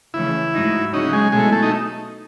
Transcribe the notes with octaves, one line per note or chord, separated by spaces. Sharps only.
C#3 E3 A3 C#4 E4
G#2 F#3 A3 D#4 F#4
C#3 F#3 C#4 D#4 F#4
G#3
B2 G#3 A3 E4 A4
A3
D#4